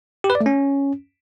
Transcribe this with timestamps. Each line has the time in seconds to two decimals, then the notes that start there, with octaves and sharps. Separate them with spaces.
0.24 G4
0.30 B4
0.35 D5
0.41 A3
0.46 C#4